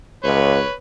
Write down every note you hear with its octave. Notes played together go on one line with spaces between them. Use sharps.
C#2 B4 C#5